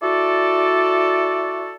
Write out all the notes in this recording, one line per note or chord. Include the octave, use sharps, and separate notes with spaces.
E4 F#4 A4 D5